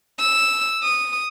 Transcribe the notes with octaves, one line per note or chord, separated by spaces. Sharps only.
E6
D#6